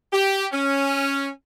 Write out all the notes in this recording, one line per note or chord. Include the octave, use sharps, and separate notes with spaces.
G4
C#4